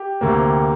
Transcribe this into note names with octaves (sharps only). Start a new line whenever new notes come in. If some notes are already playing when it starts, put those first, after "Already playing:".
Already playing: G4
D2 C3 A#3